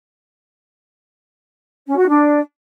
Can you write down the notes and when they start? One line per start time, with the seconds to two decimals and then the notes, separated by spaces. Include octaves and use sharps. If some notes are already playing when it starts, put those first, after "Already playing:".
1.87 C#4
1.97 F#4
2.08 D4